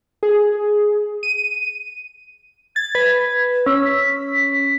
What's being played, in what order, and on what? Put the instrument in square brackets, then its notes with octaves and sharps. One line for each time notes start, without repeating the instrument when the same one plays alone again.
[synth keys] G#4
D#7
[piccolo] G#6 [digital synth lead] A6
[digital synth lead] B4
[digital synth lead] C#4 [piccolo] E6
[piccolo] B6